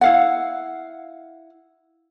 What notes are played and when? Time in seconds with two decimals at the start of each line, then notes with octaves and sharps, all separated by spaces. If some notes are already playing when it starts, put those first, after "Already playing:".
0.01 E4 F5 F#5